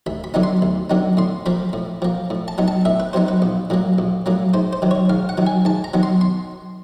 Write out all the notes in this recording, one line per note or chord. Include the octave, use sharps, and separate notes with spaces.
D2 B5
B5
D3 F#3 B3 D#4
C6
D2
D3 F#3 B3 D#4
A2 C6
F3 A#3 B5
A2
F3 A#3
A2
A5
F#3 B3 D#4
A5
A2 E5
B4
F#3 B3 D#4 C5
B4
A#1
A2 F#3 A#3
A#1
A2 F#3 A#3
G#2 C5
C5
D#3 F#3
C#5
G#2 F5
F#5
D#3 F#3
G#5
G#2 A5
A#5
D#3 F#3 B3
C6
C6